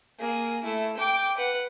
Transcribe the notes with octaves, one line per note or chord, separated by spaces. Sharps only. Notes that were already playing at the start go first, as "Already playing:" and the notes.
A#3 G#4
A3 E4
G5 D6
B4 F#5